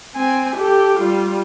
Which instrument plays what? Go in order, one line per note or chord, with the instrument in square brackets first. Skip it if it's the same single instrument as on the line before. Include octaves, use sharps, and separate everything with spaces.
[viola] C4 G#5
G4 A4
G3 F4